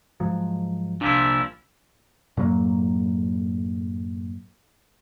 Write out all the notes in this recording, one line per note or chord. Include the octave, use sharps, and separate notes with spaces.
G#2 F3 F#3
C2 A#2 F3 D4 E4
F#2 A2 F#3 A#3